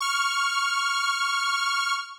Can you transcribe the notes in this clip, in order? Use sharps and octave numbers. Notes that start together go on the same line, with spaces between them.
C#6 F6